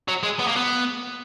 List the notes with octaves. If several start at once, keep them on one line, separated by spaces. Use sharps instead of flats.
F#3
G#3
B3
A#3
B3